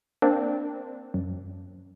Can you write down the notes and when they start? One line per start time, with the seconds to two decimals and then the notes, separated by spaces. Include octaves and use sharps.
0.22 A#3 C4 D4
1.14 F#2